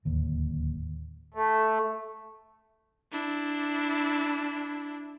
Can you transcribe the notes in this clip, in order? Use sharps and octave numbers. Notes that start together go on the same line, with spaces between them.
D1 D#2
A3
D4 E4